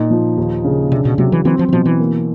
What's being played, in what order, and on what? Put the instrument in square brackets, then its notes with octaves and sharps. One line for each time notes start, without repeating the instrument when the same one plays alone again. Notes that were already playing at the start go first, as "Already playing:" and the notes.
Already playing: [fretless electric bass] A#2 [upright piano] D#4
[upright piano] F3
D#2
C#3
[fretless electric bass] C3 [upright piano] D4
[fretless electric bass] B2
[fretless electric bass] C3 [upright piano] F#3
[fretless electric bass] E3
[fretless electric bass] E3 [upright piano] C4
[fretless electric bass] F3
E3
[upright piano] B2 [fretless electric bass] F3
[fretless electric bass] E3
[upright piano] A#3